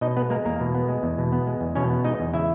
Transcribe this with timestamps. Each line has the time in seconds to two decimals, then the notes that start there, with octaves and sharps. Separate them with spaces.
0.01 B2 D#4 D#5
0.17 B3 B4
0.30 G#3 A#3 A#4
0.45 E2 A#3 A#4
0.60 B2
0.75 B3
0.88 G#3
1.03 E2
1.18 B2
1.32 B3
1.47 G#3
1.61 E2
1.75 B2 C#4 C#5
1.90 B3
2.04 G#3 D#4 D#5
2.20 E2
2.33 C#3 E4 E5